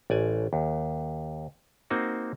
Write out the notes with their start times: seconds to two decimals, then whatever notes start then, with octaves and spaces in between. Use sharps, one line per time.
0.10 A1 D5 G#5
0.53 D#2
1.90 A#3 C4 D#4 F#4